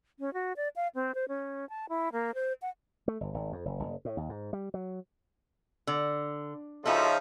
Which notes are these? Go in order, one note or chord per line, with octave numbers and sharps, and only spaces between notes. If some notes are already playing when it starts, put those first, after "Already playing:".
C#4
F#4
D5
F5
C4
C5
C#4
A5
E4
A#3
C5
F#5
A3
G1
G#1
F2
F#1
F#1
A2
D#2
G#2
G3
F#3
D3
C#3 F3 D#4 F#4 A4 E5